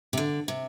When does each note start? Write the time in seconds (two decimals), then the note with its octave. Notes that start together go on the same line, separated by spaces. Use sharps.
0.13 C3
0.17 D3
0.48 C3